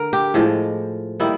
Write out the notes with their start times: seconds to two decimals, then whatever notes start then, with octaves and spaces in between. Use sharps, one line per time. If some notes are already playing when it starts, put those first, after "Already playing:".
Already playing: D3 A#4
0.13 G4
0.34 A2 F3 G#3
1.20 D#3 G3 A#3 E4